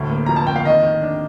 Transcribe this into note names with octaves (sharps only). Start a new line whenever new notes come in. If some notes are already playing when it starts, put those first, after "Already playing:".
Already playing: D2 A2
A#3
F3 A#5
A5
A#3 G5
F5
D#3 D#5
D#3
D4